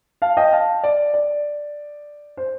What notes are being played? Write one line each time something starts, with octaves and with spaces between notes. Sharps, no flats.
F5 A5
D#5 G5
F5 A5
D5
D5
C5